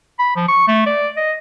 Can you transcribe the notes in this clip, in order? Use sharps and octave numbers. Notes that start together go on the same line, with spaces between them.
B5
F3
C#6
A3
D5
D#5